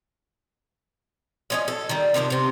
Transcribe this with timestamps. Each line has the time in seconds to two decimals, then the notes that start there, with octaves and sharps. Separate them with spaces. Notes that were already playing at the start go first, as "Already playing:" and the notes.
1.50 F3 C#4 D#5
1.68 A4
1.89 D#3 G3
2.14 C3 D#3 F3 D4
2.30 C3 C4